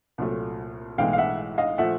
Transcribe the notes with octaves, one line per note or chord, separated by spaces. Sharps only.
C2 A#2 F#3 A3
B1 A2 E3 G#3 F5 G5
F5
E5 F#5
D#5 F5
A#2 F3 A3 E5 F#5